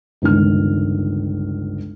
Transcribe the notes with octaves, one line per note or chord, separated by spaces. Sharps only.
G1 C#2 D#3 F6